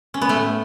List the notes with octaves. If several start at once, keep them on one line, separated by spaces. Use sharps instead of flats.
C#4
B3
A2 A3